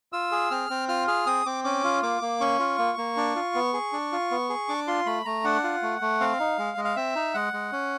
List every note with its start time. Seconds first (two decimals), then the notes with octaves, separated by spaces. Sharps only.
0.13 F4 E6
0.32 G#4
0.51 C4 F6
0.70 C4
0.89 F4 F6
1.08 G#4 F6
1.26 C4 D#6
1.46 C4 D6
1.64 C#4 D6
1.84 F4
2.03 A#3 D6
2.21 A#3
2.40 C#4 C#6
2.59 F4
2.78 A#3
2.98 A#3
3.17 D4
3.36 F4
3.55 B3
3.73 G#4
3.93 D4
4.12 F4
4.31 B3
4.50 G#4
4.69 D4 D6
4.87 F4 C6
5.06 A3 B5
5.25 A3 A#5
5.44 D4 F#5
5.64 F4
5.82 A3
6.01 A3
6.20 C4 F5
6.40 D#4
6.58 G#3
6.78 G#3
6.85 F5
6.96 C4 E5
7.16 D#4
7.34 G#3 F#5
7.53 G#3
7.72 C#4